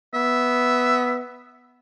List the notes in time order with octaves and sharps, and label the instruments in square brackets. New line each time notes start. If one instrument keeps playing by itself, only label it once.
[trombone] B3 [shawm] E5